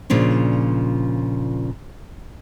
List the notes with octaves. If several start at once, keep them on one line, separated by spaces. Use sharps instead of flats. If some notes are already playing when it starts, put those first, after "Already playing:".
A#2 C#3 F3 D4